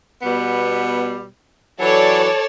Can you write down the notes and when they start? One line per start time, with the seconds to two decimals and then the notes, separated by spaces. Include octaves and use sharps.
0.23 B2 G3 B3
1.80 E3 F#3 A4 C#5 D5